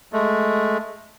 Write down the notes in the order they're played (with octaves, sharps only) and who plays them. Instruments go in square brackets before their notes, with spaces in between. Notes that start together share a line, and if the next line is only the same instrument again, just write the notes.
[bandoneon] G#3 A3